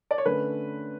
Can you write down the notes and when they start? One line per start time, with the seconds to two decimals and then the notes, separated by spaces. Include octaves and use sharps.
0.11 D5
0.18 C#5
0.25 D3 A3 C#4 B4